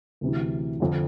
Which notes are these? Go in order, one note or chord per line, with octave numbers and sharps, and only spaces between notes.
D2 C3 E3
F2 D3